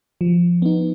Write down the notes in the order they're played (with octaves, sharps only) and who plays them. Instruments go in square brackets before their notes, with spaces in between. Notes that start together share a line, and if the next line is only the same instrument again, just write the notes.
[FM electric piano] F3
B3 D#4